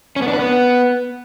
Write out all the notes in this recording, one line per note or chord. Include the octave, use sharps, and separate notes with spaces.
C#4
B3
D4
B4
B3